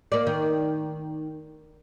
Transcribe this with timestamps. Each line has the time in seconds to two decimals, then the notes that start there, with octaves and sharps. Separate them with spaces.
0.12 A#3 D5
0.27 D#3